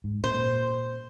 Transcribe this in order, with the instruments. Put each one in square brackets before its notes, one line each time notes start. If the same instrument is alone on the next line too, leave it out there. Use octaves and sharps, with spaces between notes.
[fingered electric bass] G#2
[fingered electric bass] A#2 [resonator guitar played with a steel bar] C5